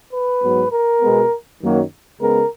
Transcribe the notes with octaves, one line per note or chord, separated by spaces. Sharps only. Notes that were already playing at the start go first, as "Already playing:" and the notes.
B4
G#2 F#3 B3
A#4
B2 G#3 B3
F#2 D#3 F#3 A#3
C#3 G#3 B3 A#4